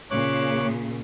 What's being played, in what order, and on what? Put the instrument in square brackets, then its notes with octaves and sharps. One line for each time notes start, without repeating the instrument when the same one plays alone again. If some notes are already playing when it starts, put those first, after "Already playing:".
[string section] A#2 C#3 [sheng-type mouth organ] C#5 D6 F#6